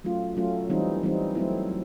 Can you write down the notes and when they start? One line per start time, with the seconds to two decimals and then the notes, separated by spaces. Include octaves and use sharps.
0.04 F#3 A3 C#4 F4
0.37 F#3 A3 C#4 F4
0.70 E3 G3 C4 D#4
1.03 E3 G3 C4 D#4
1.35 F#3 A3 C4 E4
1.68 F#3